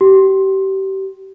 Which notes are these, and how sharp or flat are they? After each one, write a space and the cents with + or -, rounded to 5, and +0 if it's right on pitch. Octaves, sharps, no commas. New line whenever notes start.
G4 -30